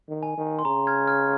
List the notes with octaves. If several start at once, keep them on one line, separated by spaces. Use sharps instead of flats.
D#3
G#5
D#3
C6
C#3 A#5
F6 G#6
F6 G#6